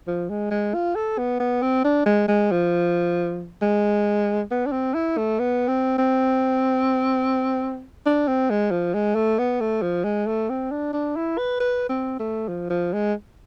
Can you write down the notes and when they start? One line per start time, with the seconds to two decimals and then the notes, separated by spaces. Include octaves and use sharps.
0.07 F3
0.30 G#3
0.51 G#3
0.74 F4
0.95 A4
1.18 B3
1.40 B3
1.62 C4
1.84 D4
2.06 G#3
2.28 G#3
2.52 F3
3.62 G#3
4.51 B3
4.66 D4
4.72 C4
4.94 E4
5.18 A3
5.39 B3
5.68 C4
5.98 C4
8.06 D4
8.28 C4
8.50 G#3
8.71 F3
8.94 G#3
9.15 A3
9.39 B3
9.61 A3
9.82 F3
10.04 G#3
10.27 A3
10.50 C4
10.71 D4
10.93 D4
11.16 E4
11.38 B4
11.60 B4
11.89 C4
12.20 A3
12.48 F3
12.70 F3
12.93 G#3